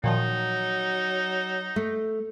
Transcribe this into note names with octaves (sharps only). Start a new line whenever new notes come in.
A#2 D#3 F3 F#3 D#4
A3